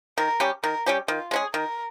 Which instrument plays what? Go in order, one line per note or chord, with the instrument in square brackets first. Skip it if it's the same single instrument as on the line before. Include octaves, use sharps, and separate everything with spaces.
[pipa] D#3 [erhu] A#4
[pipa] G3 C#4 G4
[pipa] D#3 [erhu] A#4
[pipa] G3 C#4 G4
[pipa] D#3 [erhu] F4
[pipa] G#3 C#4 G#4
[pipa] D#3 [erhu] A#4